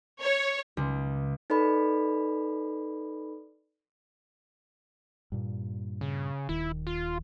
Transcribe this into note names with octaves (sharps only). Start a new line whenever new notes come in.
C#5
C#2
D#4 A4 B4 D5 B5
G2 A#2
C#3
D#1 D#3 E4
F4